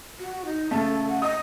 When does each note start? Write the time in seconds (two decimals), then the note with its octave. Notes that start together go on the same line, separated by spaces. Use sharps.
0.20 F#4
0.45 D#4
0.71 C#3 A3 A4
1.08 F#5
1.22 D#5 D#6